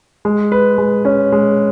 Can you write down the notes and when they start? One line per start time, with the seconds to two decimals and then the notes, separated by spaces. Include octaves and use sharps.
0.25 G#3
0.52 B4
0.78 G#3
1.05 C#4
1.32 G#3